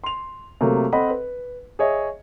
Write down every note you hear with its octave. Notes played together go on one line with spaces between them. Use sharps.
C6 F7
C3 F#3 A3 A#3
C4 A4 D#5 F#5 B5
B4
G#4 C#5 D#5 E5